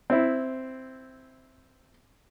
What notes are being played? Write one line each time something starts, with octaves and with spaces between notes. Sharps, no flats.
C4 E4